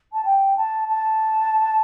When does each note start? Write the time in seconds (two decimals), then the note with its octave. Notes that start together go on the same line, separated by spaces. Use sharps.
0.13 A5
0.24 G5
0.56 A5
0.87 A5